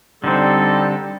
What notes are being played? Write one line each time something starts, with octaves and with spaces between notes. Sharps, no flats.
D3 G3 C4 D#4 A4